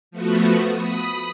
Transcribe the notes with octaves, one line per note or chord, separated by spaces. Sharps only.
F3 A3 B3 F#4
B5 D#6